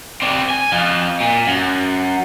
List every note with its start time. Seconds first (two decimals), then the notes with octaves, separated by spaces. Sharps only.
0.22 C4 D5
0.50 G#5
0.72 F2 F3
1.20 A#2
1.47 F#2